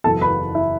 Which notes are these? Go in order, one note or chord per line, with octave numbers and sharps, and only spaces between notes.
F#1 E2 B2 A4 A5
B4 B5
E4 E5